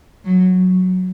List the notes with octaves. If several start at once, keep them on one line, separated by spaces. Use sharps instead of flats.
F#3